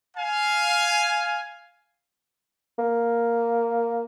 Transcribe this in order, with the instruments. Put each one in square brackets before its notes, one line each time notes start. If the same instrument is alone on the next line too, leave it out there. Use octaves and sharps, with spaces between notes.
[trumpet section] F5 G#5
[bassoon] A#3